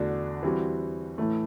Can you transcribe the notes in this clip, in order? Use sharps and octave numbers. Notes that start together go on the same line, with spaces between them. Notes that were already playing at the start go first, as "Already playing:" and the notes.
Already playing: E2 D3 A3 D4 F#4
E3 G3 C4 F#4
A2 E3 A3